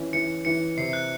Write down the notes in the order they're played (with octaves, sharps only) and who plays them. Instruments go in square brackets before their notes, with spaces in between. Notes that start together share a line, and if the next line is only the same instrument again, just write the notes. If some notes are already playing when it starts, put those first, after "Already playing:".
Already playing: [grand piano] E3 C#4
[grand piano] E3 [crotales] C#7
[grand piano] E3 [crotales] C#7
[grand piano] C3 [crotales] C7
[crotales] F#6